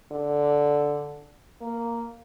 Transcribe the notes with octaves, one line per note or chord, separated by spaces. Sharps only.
D3
A#3